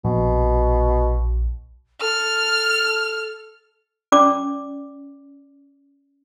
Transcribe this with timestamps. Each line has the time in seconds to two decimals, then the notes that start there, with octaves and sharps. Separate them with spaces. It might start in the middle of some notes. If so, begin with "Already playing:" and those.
0.05 A#1 B2
2.01 A4 F6
4.12 C#4 D5 D6